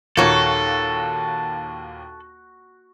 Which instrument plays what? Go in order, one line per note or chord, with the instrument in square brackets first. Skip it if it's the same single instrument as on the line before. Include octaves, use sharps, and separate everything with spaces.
[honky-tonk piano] D#2 A#2 [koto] A#3 C#5 [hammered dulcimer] F#4 [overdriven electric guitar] A4